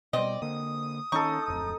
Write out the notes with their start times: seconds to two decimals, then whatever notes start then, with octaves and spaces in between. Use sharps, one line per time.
0.13 B2 G3 C4 D5 D#5
0.42 D3 A#3 D#6
1.12 D#3 C#4 D#4 A4 C#6
1.48 D1 F2